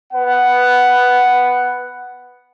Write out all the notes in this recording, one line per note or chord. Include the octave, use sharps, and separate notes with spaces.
B3 B4 F#5